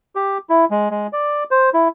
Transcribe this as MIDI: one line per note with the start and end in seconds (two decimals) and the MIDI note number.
0.16 0.38 67
0.50 0.65 64
0.71 0.89 56
0.90 1.07 56
1.13 1.44 74
1.51 1.70 72
1.74 1.88 64